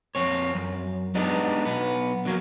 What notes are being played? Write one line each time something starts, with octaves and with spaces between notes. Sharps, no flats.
F2 C4 C#5
F#2
G#3 B3 D4 D#4 G4 A4
B1 B3
D3 F#3 A#3